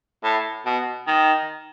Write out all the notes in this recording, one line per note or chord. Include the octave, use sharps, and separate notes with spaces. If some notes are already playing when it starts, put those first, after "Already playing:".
A2
B2
D#3